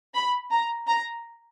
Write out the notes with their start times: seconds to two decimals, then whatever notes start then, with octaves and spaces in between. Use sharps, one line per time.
0.15 B5
0.50 A#5
0.87 A#5